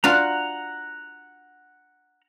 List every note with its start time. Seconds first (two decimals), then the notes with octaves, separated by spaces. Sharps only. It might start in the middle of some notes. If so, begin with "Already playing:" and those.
0.04 D4 F4 F#4 F#5 A#5